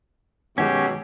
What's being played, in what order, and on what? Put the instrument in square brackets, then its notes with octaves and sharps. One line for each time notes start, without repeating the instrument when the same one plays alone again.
[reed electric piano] G2 D#3 G#3 [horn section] B2 F#3 F#4 [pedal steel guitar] C#4 G4